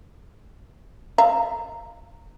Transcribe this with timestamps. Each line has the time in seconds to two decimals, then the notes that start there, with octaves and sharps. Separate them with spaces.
1.18 E5 F5 A#5